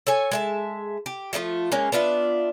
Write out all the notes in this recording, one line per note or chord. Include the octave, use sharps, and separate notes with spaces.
A4 C#5 G#5
G#3 E5 A5
G4
F3 A3 E4 F4
G#3 A#3 C#4
B3 D4 F4 E5